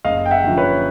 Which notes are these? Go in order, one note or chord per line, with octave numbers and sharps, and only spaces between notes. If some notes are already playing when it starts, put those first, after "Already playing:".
F#1 D#5 F5
G5
E5 F#5
F#2 D3 F3
B4 C#5